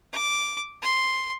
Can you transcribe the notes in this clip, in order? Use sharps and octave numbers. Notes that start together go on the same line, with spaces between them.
D6
C6